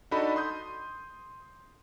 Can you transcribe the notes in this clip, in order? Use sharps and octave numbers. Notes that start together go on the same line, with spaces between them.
D4 D#4 F#4 A4 D#5 B5
C6 D#6 G6